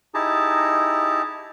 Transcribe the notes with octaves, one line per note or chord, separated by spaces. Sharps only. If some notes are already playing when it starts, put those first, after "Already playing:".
D#4 E4 G4 G#4 A5 A#5